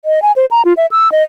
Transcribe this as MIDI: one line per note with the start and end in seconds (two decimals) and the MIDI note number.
0.05 0.22 75
0.22 0.32 80
0.36 0.46 72
0.51 0.62 82
0.65 0.73 65
0.77 0.86 76
0.92 1.11 88
1.12 1.23 75